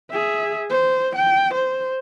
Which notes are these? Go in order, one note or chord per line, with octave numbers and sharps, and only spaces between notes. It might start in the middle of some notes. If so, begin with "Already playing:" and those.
G#4 E5
C5
G5
C5